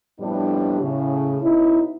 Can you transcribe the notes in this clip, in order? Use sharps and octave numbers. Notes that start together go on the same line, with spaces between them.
F2 A2 G3 B3 D4
A2 C#3
B2 C#4 D#4 E4